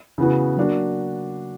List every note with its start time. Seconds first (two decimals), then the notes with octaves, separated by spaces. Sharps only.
0.18 C#3 E3 B3 F#4
0.57 F#3 A#3 D4 F#4